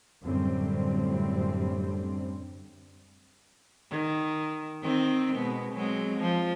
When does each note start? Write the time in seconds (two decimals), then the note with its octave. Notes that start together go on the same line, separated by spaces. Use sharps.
0.22 F#2 A2 D3 G3 C4
3.90 D#3
4.82 D#3 C4
5.36 B2 G#3 B3
5.73 F#3 G#3 C4
6.18 F3